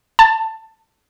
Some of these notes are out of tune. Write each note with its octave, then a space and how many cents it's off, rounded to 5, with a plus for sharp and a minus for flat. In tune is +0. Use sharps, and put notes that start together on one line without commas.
A5 +15